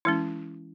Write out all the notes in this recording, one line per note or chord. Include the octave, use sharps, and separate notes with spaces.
E3 G#3 C#4 E4